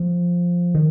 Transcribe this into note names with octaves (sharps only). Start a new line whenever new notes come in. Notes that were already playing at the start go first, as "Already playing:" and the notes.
Already playing: F3
D#3